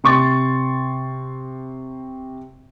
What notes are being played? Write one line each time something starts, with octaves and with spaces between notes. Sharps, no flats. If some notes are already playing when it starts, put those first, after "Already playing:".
C3 C6 C#6 A6 C#7